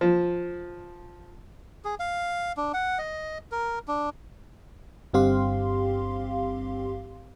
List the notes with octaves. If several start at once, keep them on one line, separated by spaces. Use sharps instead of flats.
F3
G#4
F5
D4
F#5
D#5
A#4
D4
G1 G2 C4 G4 F5 C6